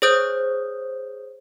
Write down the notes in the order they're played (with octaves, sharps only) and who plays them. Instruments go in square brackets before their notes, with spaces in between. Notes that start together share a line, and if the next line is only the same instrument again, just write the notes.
[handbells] G#4 C5 C#5 D#6 G6